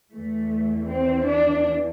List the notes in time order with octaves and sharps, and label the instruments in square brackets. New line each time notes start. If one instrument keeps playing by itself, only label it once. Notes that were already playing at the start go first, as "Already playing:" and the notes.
[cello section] E2 E3 A3
C4
D4